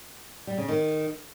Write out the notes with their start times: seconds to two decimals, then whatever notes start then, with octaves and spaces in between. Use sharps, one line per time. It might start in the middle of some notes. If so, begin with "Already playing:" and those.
0.47 G3
0.58 C#3
0.68 D#3